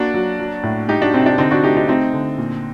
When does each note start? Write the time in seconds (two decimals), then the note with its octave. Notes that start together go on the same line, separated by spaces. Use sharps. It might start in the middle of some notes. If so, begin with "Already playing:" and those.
Already playing: A#3 D4 F#4
0.14 F#3
0.39 F#3
0.63 A2
0.88 G3 D#4 G4
1.01 D4 F#4
1.14 C3 C4 D#4
1.26 D4
1.38 D3 C4 D#4
1.51 D4 F#4
1.63 A3 D#4 G4
1.77 C4 D#4
1.88 A3 C4 D#4
2.13 D3
2.38 A#2